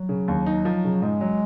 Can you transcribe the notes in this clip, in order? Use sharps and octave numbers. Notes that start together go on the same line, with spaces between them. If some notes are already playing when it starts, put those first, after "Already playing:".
Already playing: F#3
C#3
D#2
D#4
F3
C#3
G#2 G#3
F#3